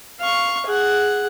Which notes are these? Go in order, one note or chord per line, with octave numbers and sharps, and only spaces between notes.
F5 C#6
G#4 F#5